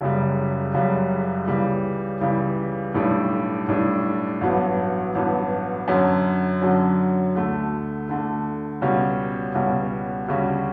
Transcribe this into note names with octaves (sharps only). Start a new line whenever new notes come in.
F#1 F#2 C#3 G3
F#1 F#2 C#3 G3
C#2 C#3 E3 G3
C#2 C#3 E3 G3
B1 A2 G3 D4
B1 A2 G3 D4
A1 G2 F#3 B3
A1 G2 F#3 B3
F#2 D3 F#3 C#4
F#2 D3 F#3 C#4
D2 D3 A3
D2 D3 A3
C#2 B2 G3 C#4 F#4
C#2 B2 G3 C#4 F#4
D2 C#3 G3 C#4 F#4